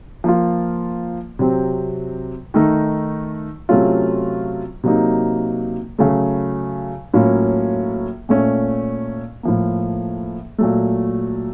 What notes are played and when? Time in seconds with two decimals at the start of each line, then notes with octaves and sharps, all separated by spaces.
0.24 F3 A#3 F4
1.39 C3 F#3 C4
2.54 D#3 A3 D#4
3.69 C3 F#3 A3 C#4 F4
4.83 C3 F#3 A#3 D#4
5.98 C#3 F#3 A3
7.14 A2 F#3 A#3 C#4 F4
8.29 A#2 A3 C#4
9.43 A2 F3 A#3
10.58 A#2 F#3 A3